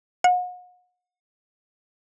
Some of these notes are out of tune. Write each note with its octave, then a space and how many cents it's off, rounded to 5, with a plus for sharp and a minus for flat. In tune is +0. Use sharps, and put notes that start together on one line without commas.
F#5 -40